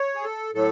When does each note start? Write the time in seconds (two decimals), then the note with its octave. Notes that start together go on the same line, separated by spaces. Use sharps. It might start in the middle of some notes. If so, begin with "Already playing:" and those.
Already playing: C#5
0.15 G#4
0.24 A4
0.54 A2 F#3 A4